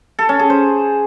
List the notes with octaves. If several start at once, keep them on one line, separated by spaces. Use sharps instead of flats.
A4
C#4
G#4
C5